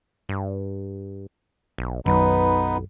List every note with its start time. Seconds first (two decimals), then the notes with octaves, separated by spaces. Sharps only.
0.29 G2
1.78 B1
2.06 B1 F#2 D#3 F#3 B3 D#4 B4